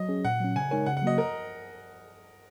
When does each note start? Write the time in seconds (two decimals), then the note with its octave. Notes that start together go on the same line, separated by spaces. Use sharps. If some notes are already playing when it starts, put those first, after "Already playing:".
Already playing: F#3 D#5
0.09 C#4 G#4
0.25 A#2 F#5
0.40 F#3 C#4
0.55 C#3 G#5
0.71 G#3 D#4 A#4 C#5 G#5
0.86 C#3 F#5
0.97 F#5
1.02 F#3 A#3 F#4 D#5
1.18 A#4